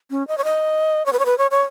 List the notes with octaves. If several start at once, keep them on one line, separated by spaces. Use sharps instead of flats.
C#4
D#5
C#5
D#5
C#5
B4
C#5
B4
C#5
C#5